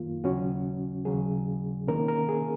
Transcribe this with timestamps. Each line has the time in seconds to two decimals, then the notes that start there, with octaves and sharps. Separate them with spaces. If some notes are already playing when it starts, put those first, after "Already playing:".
Already playing: F#2 D#3 A#3 F4
0.24 D#2 C#3 F#3 C#4 F#4
1.05 D#2 C#3 F#3 G#4
1.87 C3 D#3 A#3 C#4 A#4
2.08 A#4
2.29 G#4